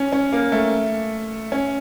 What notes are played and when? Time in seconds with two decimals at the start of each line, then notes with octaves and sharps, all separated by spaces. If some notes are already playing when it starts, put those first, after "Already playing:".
Already playing: C#4
0.13 C#4
0.33 A#3
0.52 A3
1.52 C#4